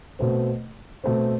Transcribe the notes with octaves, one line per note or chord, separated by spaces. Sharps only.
B2 A3 C4
B2 A3 C4